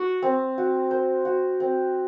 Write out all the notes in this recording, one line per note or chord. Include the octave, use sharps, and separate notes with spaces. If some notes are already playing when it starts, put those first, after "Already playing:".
Already playing: F#4
C4
F#4
C5
F#4
C4